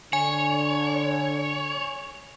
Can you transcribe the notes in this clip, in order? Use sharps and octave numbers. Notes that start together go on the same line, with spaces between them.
D3 C#5 G#5